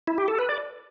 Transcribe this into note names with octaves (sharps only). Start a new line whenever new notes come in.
E4
G4
A4
B4
D5